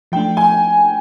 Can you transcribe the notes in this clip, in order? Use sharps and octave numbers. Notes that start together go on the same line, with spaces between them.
F3 A3 D4 G5
G#5